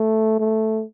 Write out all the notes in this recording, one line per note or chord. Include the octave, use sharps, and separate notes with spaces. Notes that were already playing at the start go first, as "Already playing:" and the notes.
Already playing: A3
A3